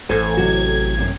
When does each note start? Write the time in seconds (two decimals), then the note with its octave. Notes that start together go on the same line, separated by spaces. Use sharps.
0.09 A1 A4 C5 G#5 G#6
0.37 C3 F#3 F#4
0.98 F#2 C3